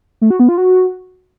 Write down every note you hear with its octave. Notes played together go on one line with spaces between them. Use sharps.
A3
F#4
B3
F4
F#4